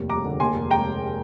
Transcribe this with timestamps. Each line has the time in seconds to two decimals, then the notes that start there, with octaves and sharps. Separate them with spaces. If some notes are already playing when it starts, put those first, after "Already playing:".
Already playing: F1 D#2
0.09 G3 A#5 D6
0.25 D3
0.40 D#2 G#5 C6
0.56 F1
0.71 G#3 G5 A#5